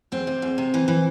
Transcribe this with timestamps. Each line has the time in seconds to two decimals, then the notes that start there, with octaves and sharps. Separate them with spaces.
0.12 E2 C4
0.27 C3
0.42 E2
0.58 C3
0.74 E3
0.88 E3